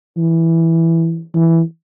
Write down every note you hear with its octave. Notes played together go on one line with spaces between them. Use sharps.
E3
E3